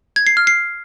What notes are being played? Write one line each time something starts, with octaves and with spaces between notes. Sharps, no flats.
G#6
C7
F6
C7